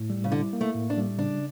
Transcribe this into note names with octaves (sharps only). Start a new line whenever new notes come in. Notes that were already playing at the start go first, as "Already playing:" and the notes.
Already playing: A2
G3
C#3
D3 E4
A#3
A3
A2
D4
G3
C#3 D4